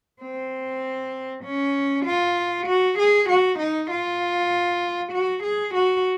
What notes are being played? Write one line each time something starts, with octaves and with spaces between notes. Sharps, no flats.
C4
C#4
F4
F#4
G#4
F#4
D#4
F4
F#4
G#4
F#4